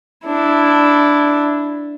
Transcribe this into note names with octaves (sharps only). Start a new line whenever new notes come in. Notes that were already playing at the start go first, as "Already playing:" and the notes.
D4 E4